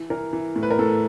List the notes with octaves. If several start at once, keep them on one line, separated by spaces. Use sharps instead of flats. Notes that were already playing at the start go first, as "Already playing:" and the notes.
Already playing: E3
E3 A#4
E3
A2
B4
A#4
A2 A4